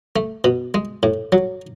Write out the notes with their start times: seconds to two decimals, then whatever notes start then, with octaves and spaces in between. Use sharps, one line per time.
0.16 A3
0.44 B2
0.74 G#3
1.03 A2
1.32 F#3